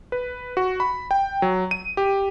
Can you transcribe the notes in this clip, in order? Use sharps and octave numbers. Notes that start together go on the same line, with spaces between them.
B4
F#4
B5
G5
F#3
D#7
G4